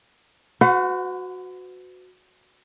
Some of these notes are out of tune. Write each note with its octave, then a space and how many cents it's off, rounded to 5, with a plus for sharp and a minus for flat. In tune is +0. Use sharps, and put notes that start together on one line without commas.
F#4 -10 B4 +45 F#5 -40